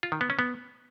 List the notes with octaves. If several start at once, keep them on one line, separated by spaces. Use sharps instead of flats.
F4
D#3
B3
C#4
B3